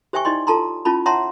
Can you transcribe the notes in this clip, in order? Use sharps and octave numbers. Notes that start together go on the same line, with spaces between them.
G4 C5 E5 G5 G#5 C#6
D#4 E4 D5 D#5 C6
F4 A4 A5 A#5 C6
C#4 E4 F4 A5 B5
C#5 E5 F#5 A5 A#5 C6